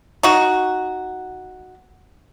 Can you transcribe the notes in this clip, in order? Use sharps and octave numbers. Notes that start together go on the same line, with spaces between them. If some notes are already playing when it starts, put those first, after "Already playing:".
D#4 F#4